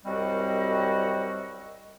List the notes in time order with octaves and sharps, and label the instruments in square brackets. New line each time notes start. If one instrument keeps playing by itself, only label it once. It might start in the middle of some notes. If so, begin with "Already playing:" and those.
[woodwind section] C2 F#2 G3 C4 F#4 D#5